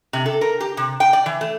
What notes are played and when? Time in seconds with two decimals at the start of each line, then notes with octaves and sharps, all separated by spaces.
0.13 C3
0.26 A4
0.41 A#4
0.60 G4
0.77 C3
1.00 G5
1.13 D5
1.26 E3
1.41 A3